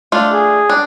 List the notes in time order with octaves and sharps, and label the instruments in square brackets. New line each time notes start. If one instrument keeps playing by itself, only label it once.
[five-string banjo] A3 D4 F4
[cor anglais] G#4
[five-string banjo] D4